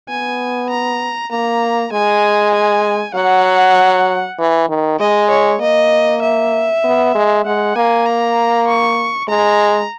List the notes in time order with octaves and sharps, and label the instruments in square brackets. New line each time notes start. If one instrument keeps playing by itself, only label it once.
[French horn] B3 [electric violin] G#5
[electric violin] A#5
[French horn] A#3 [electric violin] A#5
[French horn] G#3 [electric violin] G#5
[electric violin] G#5
[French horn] F#3 [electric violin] F#5
[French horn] E3
D#3
[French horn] G#3 [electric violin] D#5
[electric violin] C#5
[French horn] A#3 [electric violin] D#5
[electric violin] E5
[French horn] B3
G#3
[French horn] G#3 [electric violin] F#5
[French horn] A#3 [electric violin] G#5
[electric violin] A#5
C#6
[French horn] G#3 [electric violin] A#5